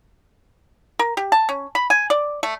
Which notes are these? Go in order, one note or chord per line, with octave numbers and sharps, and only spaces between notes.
A#4
G4
A5
C#4
B5
G#5
D5
A3